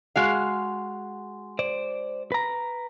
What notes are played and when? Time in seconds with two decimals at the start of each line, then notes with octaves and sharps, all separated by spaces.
0.16 G#3 F#4 F5
1.59 C5 D5
2.32 B4 A#5